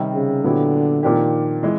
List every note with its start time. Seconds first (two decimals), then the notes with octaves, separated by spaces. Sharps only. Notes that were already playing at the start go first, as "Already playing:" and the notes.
Already playing: C3 D#3 G3
0.14 C#3
0.43 A#2 D3 F#3 B3 E4 G4
1.03 A#2 D#3 F3 A#3 D4 G4
1.63 E3 G#3